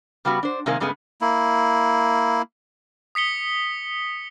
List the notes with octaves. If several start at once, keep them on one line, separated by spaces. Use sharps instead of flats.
C#3 G3 B3 F#4
D4 C5
C3 D#3 G#3 A#3 G#4
G2 C#3 G#3 A3 B3
A#3 E4
D#6 B6 C#7 G7